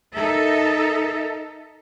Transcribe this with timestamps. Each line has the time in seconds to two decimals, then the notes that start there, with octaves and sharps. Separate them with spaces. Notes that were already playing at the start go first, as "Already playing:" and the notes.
0.14 D#4 A4 A#4 E5